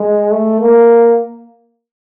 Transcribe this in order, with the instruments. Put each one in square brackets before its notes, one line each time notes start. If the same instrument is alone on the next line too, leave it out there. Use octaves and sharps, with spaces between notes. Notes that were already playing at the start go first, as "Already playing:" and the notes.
Already playing: [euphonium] G#3
A3
A#3